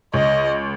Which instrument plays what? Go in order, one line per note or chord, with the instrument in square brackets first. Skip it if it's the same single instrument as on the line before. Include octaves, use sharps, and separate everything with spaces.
[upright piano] C#2 [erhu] D#5